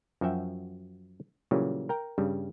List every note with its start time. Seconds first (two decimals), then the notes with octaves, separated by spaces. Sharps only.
0.21 F#2 F3 F#4 E5 G5
1.51 A#2 C#3 E3 F#3 G3
1.89 A#4 G5 A#5
2.18 G2 C#3 G3